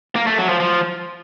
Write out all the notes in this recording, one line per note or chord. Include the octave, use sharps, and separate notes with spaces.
A#3
A3
F#3
F3
F3